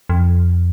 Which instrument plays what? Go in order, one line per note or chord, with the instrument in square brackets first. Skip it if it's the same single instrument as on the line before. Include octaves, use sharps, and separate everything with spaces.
[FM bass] F2